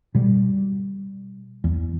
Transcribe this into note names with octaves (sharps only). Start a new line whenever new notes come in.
B2 G3
E2